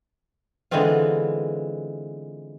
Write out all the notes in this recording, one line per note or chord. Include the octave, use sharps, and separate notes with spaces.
D3 E3 G#3 B3 C4 F4